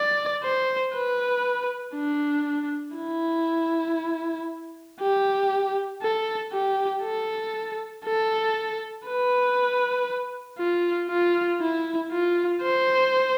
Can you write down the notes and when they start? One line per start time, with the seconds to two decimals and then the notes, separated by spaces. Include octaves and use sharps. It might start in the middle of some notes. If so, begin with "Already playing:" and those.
Already playing: D5
0.43 C5
0.94 B4
1.95 D4
2.97 E4
5.00 G4
6.02 A4
6.52 G4
7.03 A4
8.05 A4
9.06 B4
10.59 F4
11.09 F4
11.61 E4
12.11 F4
12.62 C5